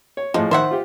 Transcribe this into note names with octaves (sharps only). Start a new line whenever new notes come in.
C#5
A2 F3 G#3
D#3 C5 E5 F#5
F4 G4